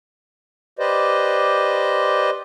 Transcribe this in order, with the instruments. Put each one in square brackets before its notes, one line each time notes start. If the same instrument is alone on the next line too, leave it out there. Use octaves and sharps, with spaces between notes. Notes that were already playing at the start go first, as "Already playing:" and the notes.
[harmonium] G4 B4 C5 D5 D#5